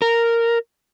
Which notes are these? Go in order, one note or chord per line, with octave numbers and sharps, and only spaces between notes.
A#4